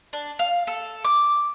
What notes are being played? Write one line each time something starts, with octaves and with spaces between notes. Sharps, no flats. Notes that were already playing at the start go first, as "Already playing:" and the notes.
D4
F5
A4
D6